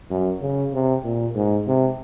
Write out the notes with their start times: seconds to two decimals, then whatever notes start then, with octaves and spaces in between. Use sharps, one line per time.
0.10 F#2
0.42 C#3
0.73 C3
1.04 A#2
1.35 G#2
1.67 C3